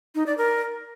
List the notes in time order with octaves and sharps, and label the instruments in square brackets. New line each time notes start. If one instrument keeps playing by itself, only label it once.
[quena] D#4
D5
A#4